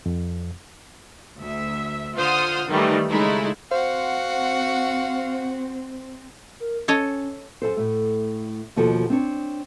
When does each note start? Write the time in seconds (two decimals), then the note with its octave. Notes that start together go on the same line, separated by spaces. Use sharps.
0.06 F2
1.39 D2 E5
2.16 D3 F4 C5 F#5 D#6 F6
2.70 D#3 E3 G3 A3
3.09 C#3 G#3 A3 D#4 E4
3.71 C4 F#4 C5 F5 F#5
6.60 A#4
6.88 C#4 A4 C#5 D#5
7.62 F#2 C#3 A4 C5
7.77 A2 A3
8.76 D#2 B2 F3 F#4 A4
9.10 C4 D4 C#5